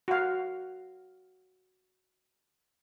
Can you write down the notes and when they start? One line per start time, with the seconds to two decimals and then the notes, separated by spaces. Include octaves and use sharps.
0.08 F#4 F5